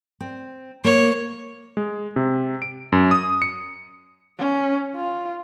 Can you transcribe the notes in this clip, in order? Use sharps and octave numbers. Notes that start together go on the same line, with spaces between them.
C4
A#3 C#5
G#3
C3
D7
F#2
D#6
C#7
C#4
F4